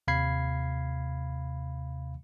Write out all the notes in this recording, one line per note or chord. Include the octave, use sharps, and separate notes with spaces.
D#2 C3 F5 B5 G#6 C7